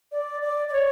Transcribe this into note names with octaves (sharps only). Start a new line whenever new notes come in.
D5
D5
D5
C#5